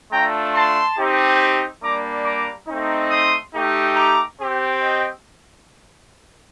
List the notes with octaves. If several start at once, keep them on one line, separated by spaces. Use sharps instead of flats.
A3 D4 F4 G5 A#5
A5 C6
C4 D#4 G4
G3 A#3 D4 A#5 D6
A#5 D6
A3 C4 D#4
C6 D#6
A3 D#4 G4
A#5 D6
C4 G4
D#5 G5